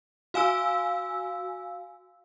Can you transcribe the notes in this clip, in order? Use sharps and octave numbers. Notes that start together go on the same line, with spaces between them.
F#4 F5 G#5 E6